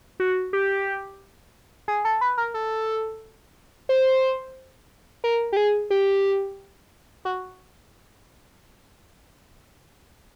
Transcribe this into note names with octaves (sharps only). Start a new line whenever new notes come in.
F#4
G4
G#4
A4
B4
A#4
A4
C5
A#4
G4
G#4
G4
F#4